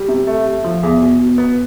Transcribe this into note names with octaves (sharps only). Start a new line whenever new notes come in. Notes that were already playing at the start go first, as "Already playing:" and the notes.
Already playing: G3
C3
A3
A3
F3
E2
B2
B2
B3